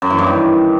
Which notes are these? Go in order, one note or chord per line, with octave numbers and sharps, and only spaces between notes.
F#2
E3
G2
D#3